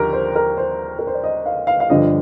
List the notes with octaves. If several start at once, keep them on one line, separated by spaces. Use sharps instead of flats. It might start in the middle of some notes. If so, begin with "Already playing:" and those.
Already playing: D#2 D3 F3 G4 A#4
C5
A#4
C5
A#4
C5
D5
D#5
F5
F5
F5
G1 G2 D3 F3 D#5